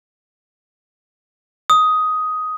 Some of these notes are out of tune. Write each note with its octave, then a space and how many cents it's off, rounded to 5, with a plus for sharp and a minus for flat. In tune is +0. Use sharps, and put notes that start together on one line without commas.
D#6 +10